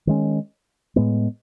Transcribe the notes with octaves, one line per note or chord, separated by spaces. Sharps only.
D#3 G#3 C#4
A2 G#3 B3